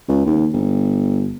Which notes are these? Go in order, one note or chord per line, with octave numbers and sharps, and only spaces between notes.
C#2
D#2
G1